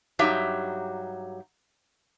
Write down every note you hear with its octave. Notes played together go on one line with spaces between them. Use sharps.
G2 F#3 D#4 G4 E5